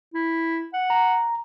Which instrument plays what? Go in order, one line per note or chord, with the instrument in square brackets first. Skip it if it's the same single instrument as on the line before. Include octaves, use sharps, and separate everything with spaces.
[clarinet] E4
F#5
[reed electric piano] A#5